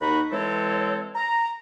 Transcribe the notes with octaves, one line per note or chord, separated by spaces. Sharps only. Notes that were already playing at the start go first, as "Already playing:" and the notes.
D#2 D#4 F#4 B5
E3 G#3 C4 A4 C#5
A#5